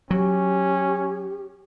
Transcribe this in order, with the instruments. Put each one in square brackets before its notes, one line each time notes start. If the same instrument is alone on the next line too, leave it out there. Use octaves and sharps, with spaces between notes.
[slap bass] F#3 [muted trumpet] C#4 [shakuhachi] G4